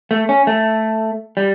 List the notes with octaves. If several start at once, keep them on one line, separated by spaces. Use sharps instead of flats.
A3
C#4
A3
G3